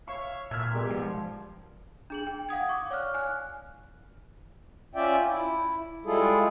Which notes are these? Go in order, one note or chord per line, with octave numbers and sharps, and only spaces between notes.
C#5 E5 F5 C#6
A#2 E5 F6 G#6
B2 G3 G#3 A#4
G#2 F3
D4 G#4 F#7
G5
F5 F#5 D#6 G#6
C#6 D6
C#5 D5 F5 F6 F#6
G#5 F6 F#6
C#4 F4 D5 E5 G5
E4
G3 G#3 E4 F4 G#4 A4